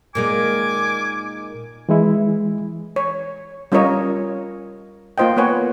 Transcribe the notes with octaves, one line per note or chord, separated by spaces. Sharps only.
A#2 D#3 G#3 A#3 D#4 G#5 D6
E3 G#3 E4
C#5
G3 C#4 F4 A#4 C#5 D#5
A#3 F4 C5 D#5 G5
A#3 B3 B4 C#5 F#5 G#5